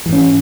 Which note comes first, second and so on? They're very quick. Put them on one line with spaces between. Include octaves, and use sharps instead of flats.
E3 G#2 C#4